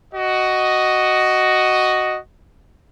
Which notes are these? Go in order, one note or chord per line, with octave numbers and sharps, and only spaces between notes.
F#4 D#5